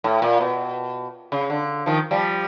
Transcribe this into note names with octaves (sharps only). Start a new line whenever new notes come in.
A2
A#2
B2
C#3
D3
D#3 F3
F3 G3